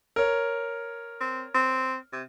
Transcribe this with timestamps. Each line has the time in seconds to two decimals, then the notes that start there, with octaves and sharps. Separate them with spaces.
0.16 A#4 C#5
1.21 C4
1.55 C4
2.13 C3